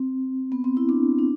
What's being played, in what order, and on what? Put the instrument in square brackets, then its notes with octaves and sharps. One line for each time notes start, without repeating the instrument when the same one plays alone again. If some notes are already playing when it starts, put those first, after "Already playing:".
Already playing: [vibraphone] C4
B3
C4
E4
D4
D4